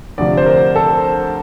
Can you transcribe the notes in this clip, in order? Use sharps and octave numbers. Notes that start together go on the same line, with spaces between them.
D2 C3 F3 D5
C5
A#4
A4